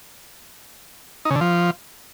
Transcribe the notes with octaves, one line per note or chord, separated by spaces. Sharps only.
D#4
C#3
D3
F3